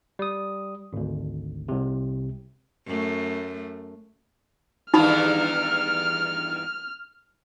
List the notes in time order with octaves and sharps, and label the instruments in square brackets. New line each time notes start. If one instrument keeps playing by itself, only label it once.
[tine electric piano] G3 D#6
G#1 D2
C2 C3
[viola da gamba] F#2 A3
[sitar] E2 G2 D#3 [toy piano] D#4 B5 [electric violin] F6